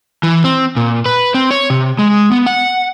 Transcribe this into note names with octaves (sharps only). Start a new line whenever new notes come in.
E3
C4
A#2
B4
C4
C#5
C3
G#3
B3
F#5